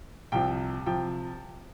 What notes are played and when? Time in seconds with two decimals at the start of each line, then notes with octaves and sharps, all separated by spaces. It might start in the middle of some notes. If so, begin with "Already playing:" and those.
0.32 C2 C3 F3 G5
0.86 C3 F3 G5